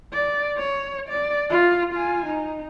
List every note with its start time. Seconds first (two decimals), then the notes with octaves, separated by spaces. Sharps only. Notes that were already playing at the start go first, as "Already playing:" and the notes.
0.13 D5
0.58 C#5
1.09 D5
1.49 F4
1.93 F4 G#5
2.26 D#4